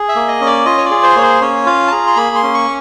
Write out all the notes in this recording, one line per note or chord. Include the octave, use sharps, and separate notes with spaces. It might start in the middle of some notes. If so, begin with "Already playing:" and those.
Already playing: G#4
E5
A#3
D#5
C#4
D5
F4 D#5
C#5
D5
G#4
C5
A#3 C#5
C5
C#4 C#5
F4 F5
A5
G#4 A#5
C6
A#3 B5
C6
C#4
C#6